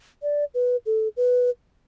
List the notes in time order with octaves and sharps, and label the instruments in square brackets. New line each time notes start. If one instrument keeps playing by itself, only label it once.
[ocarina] D5
B4
A4
B4